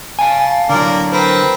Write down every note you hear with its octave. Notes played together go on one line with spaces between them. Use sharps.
F5 G#5 A5
D3 F#3 A#3 A#4 D5
C4 A#4 B4